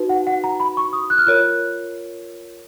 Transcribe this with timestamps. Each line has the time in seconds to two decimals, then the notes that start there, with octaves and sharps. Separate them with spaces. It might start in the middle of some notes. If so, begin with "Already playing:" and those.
Already playing: D#4 F#4 B4
0.09 F#5
0.27 F#5
0.44 A#5
0.60 B5
0.77 C#6
0.93 D#6
1.10 F#6
1.18 F6
1.27 F4 A#4 C#5 F#6